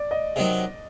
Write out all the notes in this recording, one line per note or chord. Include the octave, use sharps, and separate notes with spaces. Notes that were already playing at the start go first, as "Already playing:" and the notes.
Already playing: D5
D#5
C3 D#3 F#3